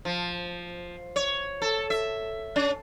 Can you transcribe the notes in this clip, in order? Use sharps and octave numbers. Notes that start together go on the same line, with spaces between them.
F3
C#5
A4
E5
C#4